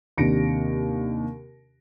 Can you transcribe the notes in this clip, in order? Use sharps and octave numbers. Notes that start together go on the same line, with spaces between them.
D#2 C3 D4 A#6 C#7 D7